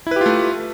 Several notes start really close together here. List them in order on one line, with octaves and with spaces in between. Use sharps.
E4 B4 G4 F4 A3